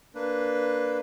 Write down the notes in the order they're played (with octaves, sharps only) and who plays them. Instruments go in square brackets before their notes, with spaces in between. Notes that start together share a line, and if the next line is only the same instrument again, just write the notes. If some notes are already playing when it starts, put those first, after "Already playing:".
[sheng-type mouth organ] A#3 D4 B4